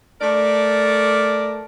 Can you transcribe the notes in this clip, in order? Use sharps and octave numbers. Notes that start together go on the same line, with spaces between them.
A3 A#4 D5